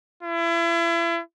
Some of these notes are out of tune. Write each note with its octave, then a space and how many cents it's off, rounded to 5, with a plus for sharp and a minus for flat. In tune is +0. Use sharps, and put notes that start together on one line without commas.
E4 +35